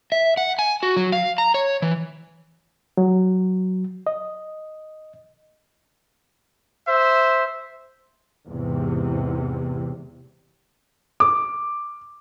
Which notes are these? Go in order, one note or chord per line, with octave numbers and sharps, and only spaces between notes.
E5
F#5
G#5
F#4
F#3
F5
A#5
C#5
E3
F#3
D#5
C5 E5
E2 G#2 C3
D6